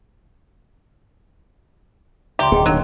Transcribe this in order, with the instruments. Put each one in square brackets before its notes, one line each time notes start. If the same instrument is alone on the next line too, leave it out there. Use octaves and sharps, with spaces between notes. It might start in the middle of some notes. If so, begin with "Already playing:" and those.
[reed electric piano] C#2 D5 A#5 [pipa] G4 [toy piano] E5 C6
[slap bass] D1 A#3 [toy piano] G#4 D#5 G5
[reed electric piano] A#2 D#3 D4 [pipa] F#3